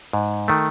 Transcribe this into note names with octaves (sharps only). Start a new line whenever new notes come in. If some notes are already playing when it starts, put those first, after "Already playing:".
G#2
D#3 A3